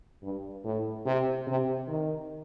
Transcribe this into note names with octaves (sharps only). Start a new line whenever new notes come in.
G2
A2
C3
C3
D#3